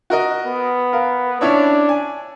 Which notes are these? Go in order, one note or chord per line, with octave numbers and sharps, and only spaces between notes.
F#4 A#4 D#5
B3
A#4 F5
C#4 D4 E4 C#5
G#5